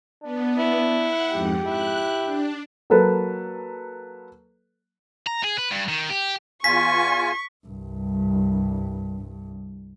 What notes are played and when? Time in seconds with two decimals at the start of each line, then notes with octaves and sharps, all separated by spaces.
0.23 B3 D4
0.58 E4
0.98 F#5
1.32 F2 G#2 G4
1.66 E4 F#6
2.25 D4
2.90 F#3 A#3 A4 B4
5.26 A#5
5.44 G#4
5.58 B4
5.71 G2
5.88 D#3
6.10 G4
6.64 E2 F4 G#5 C#6 B6
7.67 C2 G2